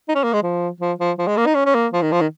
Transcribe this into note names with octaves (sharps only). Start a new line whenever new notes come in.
D#4
C#4
A#3
G#3
F3
F3
F3
F3
G#3
A#3
D#4
C#4
C#4
A#3
F3
D#3
F3
D#3